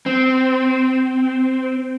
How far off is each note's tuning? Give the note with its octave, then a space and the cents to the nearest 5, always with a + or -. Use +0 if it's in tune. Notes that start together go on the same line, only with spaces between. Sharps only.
C4 -15